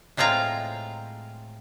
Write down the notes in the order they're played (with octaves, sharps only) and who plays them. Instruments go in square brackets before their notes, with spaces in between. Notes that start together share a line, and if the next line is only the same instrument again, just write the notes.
[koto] A2 G#3 C4 F4 A#5